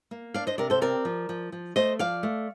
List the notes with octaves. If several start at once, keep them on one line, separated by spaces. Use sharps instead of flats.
A#3
D4 D5 F5
C5 D#5
C3 A#4 D5
A4 C5
C4 A#4 D5
F3
F3
F3
A3 C5 D#5
F3 D5 F5
A3